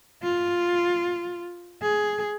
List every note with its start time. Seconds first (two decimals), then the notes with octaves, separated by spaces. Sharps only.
0.23 F4
1.82 G#4